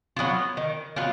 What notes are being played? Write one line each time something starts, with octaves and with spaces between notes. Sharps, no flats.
F#3 B3 F4
D#3
F#3 B3 F4